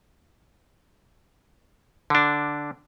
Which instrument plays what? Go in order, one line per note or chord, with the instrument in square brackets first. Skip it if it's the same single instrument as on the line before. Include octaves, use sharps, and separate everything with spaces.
[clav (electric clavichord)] D3 D4